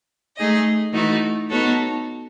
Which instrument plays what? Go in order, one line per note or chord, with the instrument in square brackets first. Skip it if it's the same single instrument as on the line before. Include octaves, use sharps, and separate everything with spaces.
[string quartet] A3 D#4 G#4 D#5
E3 A3 D#4 F#4
B3 D#4 F#4 A4 C#5